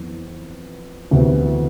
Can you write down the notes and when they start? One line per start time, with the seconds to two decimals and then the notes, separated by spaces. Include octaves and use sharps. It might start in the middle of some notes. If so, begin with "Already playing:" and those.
Already playing: F2 E3 B3
1.11 D2 C3 E3 B3 E4